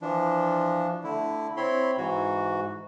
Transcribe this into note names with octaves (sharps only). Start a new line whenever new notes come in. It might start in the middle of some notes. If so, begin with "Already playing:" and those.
E3 F3 D4
D3 A3 E4
C4 E4 C#5 B5 C6
G#2 E3 F#4